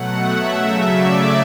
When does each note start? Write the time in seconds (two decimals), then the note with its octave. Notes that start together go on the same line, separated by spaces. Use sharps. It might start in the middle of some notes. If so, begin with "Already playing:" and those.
Already playing: B2 F#3 A3 F#5
0.20 E5
0.56 C#3 F#3 A3 E5
0.92 D5